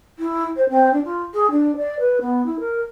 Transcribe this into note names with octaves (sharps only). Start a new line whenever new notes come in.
E4
C5
C4
D4
F4
G#4
D4
D5
B4
B3
E4
A#4